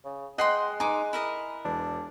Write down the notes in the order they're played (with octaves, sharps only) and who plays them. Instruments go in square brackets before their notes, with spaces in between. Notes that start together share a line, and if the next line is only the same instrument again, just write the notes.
[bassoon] C#3
[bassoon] G#3 [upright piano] D#5 F#6 C7 [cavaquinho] F#5 G5 C6
[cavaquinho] D#4 D6 [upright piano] G#5 C6
[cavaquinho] E4 A#4 D#5
[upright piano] E1 [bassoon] D4